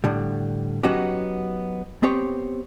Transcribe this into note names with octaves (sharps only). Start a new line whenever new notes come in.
A2 D3 G3
F#3 B3 C#4 D#4 F#4 G4
B3 C4 G4 C#5